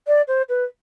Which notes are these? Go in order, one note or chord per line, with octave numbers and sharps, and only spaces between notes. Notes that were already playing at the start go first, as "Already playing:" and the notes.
D5
C5
B4